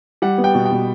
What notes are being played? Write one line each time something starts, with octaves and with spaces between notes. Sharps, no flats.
G3 F#5
B3
G5
B2
G5
B2